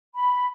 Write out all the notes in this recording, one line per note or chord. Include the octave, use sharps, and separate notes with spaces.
B5